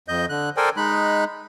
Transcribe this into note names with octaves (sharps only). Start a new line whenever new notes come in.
F2 D#5 G6
D3 F#6
A4 A#4 C5 D5 G5 G#5
G#3 D#4 B5 F#6